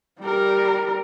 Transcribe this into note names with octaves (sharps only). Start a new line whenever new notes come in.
G3 A#4